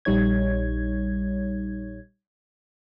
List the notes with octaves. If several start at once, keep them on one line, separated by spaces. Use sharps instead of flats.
A#1 G3 D#4 C#5 G#6